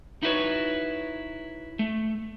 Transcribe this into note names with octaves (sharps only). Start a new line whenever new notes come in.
D#4 E4 F#4 G4 B4 C#5
A3